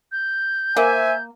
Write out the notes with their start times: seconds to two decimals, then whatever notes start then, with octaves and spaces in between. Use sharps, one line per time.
0.12 G6
0.77 A#3 C5 E5 G#5